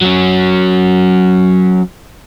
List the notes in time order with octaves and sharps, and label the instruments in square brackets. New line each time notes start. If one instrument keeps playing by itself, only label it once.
[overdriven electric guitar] F#3 C#4